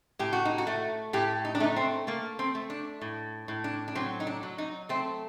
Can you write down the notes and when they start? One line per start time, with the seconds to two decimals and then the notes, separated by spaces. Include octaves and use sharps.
0.19 A2 G4
0.33 F#4
0.45 D#4
0.58 F#4
0.67 A3
1.13 A2 G4
1.45 D#4
1.55 D4
1.60 A3 D#4
1.76 C4
2.07 A3 A#3
2.39 C4
2.55 A3
2.70 D4
3.02 A2
3.48 A2
3.64 D4
3.88 D4
3.95 F#3 C4
4.20 D#4
4.27 D4
4.43 F#3
4.58 D#4
4.89 A3 C4